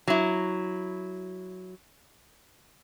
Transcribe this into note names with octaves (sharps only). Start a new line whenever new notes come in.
F#3 E4